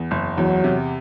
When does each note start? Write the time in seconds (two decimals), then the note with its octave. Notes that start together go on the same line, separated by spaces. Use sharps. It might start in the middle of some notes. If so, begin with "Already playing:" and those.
Already playing: E2
0.11 F#1
0.38 E2 F#3
0.64 C3